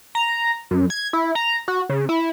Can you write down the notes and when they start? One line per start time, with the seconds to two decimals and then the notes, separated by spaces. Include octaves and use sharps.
0.15 A#5
0.71 F#2
0.90 G#6
1.13 E4
1.35 A#5
1.68 F#4
1.90 C#3
2.09 E4